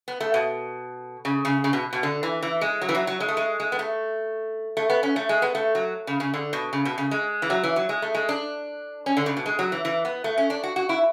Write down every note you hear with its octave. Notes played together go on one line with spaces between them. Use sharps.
B3
A3
B2
C#3
C#3
C#3
B2
B2
D3
E3
E3
G#3
F#3
E3
F#3
F#3
G#3
A3
G#3
G#3
B3
A3
A3
B3
C#4
A3
G#3
B3
A3
F#3
C#3
C#3
D3
B2
C#3
B2
C#3
G#3
E3
F#3
E3
F#3
G#3
A3
G#3
D4
C#4
D3
C#3
B2
G#3
F#3
E3
E3
B3
A3
C#4
D4
F#4
F#4
E4